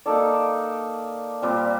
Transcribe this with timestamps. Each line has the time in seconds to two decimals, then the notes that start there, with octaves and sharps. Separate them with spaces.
0.06 A#3 D#4 A4 D5
1.42 A#2 G3 C4